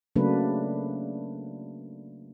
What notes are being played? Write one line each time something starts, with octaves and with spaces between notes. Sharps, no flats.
C#3 F#3 A3 A#3 D4 B4